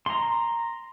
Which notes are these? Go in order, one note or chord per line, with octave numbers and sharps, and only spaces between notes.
A#5 C6